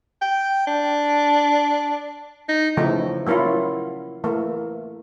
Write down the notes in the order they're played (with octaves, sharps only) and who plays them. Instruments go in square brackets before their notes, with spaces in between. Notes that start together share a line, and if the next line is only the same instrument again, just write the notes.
[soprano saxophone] G5
D4
D#4
[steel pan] C#3 E3 F3 A3 D#4
F#3 A#3 C#4 E4 F4
E3 A3 A#3